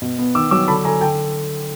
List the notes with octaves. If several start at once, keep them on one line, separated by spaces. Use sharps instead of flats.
B2
B3
D#3 D6 E6
F#3 D6 E6
D3 A5 B5
D3 G#5 A#5
D3 G5 A5